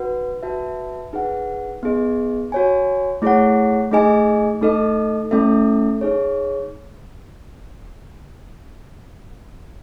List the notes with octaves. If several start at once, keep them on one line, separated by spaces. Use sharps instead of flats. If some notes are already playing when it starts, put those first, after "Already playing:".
Already playing: D#4 F#4 B4 F#5
F#4 B4 E5 A5
D#4 G#4 B4 F#5
B3 D#4 G#4 D#5
F#4 C#5 G#5
A3 E4 G#4 C#5 F#5
A3 D#4 G#4 D#5 G#5
A3 D#4 A4 D#5
A3 C#4 E4 A4 E5
D#4 G#4 C#5